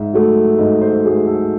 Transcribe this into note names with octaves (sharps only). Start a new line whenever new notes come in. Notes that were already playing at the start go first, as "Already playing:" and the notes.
Already playing: G#2 E5
F#3 A3
G#2 D#5
C5
F#3 A3 G#4
A4